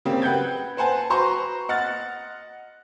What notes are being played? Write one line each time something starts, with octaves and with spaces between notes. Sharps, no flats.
C#3 G3 A#3 C4
B4 F#5 G5 G6 G#6
B4 C5 F#5 G#5 A5
F#4 B4 C5 A#5 C6 C#6
D#5 F#5 F6 A6